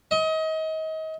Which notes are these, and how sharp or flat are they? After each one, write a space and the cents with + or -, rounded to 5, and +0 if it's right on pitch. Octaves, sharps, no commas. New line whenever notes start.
D#5 +30